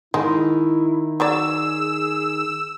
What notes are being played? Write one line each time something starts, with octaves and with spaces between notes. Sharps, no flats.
D#3 G#3 E4
F#3 G#4 C#5 D5 E6